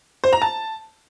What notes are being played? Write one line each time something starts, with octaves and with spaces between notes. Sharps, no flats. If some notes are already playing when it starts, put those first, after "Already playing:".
C5
A#5
A5